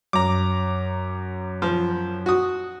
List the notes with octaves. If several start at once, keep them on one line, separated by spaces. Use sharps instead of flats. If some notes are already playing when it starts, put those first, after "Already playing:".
F#2 A#5 D6
F3
F#4 D#6